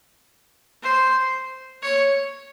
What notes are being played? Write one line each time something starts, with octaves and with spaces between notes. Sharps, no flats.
C5
C#5